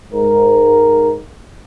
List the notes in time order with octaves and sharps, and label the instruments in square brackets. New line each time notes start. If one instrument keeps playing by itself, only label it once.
[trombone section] G#2 A#4